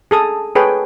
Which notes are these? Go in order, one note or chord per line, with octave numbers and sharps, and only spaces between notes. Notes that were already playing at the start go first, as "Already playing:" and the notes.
G#4 A4 D#6
G#4 A4 B4 C#5 G5